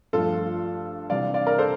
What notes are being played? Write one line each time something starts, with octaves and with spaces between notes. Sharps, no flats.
G2 F3 A3 F4 A4
C3 E3 G3 D4 D5 F5
D5 F5
A#4 D5
A4 C5